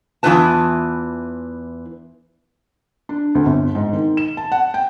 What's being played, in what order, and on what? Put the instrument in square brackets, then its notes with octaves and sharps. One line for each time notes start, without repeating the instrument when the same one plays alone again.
[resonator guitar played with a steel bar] E2 E3 G#3 F4 B4 A5
[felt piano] D4
D2
G1
G#2
D#3
E7
A5
F#5
G5